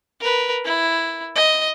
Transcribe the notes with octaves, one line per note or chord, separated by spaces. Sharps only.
A#4 B4
E4
D#5